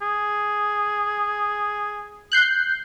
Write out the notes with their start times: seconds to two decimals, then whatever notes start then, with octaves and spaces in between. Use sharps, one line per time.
0.02 G#4
2.32 F#6 G6 C7